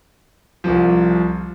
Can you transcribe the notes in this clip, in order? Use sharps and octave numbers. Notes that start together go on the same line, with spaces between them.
C2 C3 F3